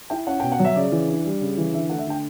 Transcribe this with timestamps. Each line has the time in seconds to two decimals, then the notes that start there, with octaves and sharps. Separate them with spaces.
0.10 E4 G5
0.27 C#4 F#5
0.40 B2 G5
0.52 F#5
0.59 F#3 E5
0.76 C#3 D5
0.92 E3
1.09 D4
1.25 G3
1.41 C#3
1.58 E3
1.74 D3 E5
1.90 A3 F#5
1.98 E5
2.07 D3 G5